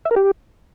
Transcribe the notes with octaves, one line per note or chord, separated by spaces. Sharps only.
E5
A#4
G4